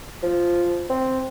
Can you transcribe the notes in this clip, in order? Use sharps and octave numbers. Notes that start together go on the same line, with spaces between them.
F3
C4